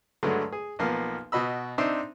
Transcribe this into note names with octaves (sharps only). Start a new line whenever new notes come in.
G2 D3 F#3 G#3 A3
G#4
B1 F3 A#3 B3 F5
B2 F#4 D#5 B5 E6
C4 D4 D#4 C5 E5 C6